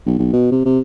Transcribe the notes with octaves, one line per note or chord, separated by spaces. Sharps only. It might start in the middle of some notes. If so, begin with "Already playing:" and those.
B1
B1
B2
C3
C3